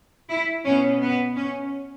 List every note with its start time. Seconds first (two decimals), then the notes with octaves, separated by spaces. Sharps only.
0.30 E4
0.65 B2 B3 C#4
1.01 B3
1.36 C#4